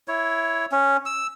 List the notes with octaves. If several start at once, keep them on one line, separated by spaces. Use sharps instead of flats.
E4 C#5
C#4
E6